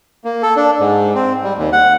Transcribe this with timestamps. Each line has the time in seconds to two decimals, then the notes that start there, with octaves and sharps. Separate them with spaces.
0.24 A#3
0.43 A4
0.56 D4
0.80 G#2
1.15 C4
1.44 G3
1.58 D#2
1.73 F#5